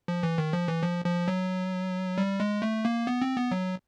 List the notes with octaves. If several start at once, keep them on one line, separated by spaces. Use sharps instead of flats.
F3
E3
D#3
F3
E3
F3
F3
F#3
G3
G#3
A3
A#3
B3
C4
B3
F#3